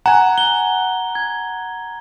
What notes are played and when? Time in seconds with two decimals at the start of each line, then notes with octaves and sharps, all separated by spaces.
0.06 F#5 G#5 A#5
0.38 G7
1.15 G#6